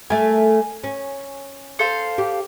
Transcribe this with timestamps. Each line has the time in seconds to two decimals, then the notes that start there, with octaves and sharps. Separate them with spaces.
0.10 A3 A#4 G#5
0.84 C#4
1.79 A4 C5 F5
2.18 G4